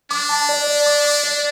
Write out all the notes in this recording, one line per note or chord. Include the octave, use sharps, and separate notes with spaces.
D4 D6
A5
D5
D5
D6
D6
D5